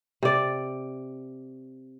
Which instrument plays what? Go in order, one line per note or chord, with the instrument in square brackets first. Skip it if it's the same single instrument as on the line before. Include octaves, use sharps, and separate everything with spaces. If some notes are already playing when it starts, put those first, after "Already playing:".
[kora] C3 D5